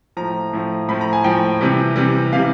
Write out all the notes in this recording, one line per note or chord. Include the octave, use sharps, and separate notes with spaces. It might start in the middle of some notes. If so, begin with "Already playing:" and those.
A2 F3 A#5
A2 F3
A2 F3 B5
A#5
G#5
A2 F3 G5
C3 E3 G3
C3 E3 G3
C3 E3 G3 F5